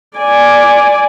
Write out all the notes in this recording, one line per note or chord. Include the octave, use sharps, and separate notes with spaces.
D5 G#5